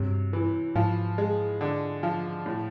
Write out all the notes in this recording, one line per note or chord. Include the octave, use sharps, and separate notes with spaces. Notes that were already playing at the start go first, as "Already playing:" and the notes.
Already playing: G2 C3 F#3
E3
G#2 F3
G#3
D3
F3
A2